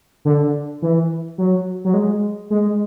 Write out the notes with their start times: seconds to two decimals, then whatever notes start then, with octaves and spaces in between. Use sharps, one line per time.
0.25 D3
0.82 E3
1.38 F#3
1.85 F#3
1.94 G#3
2.50 G#3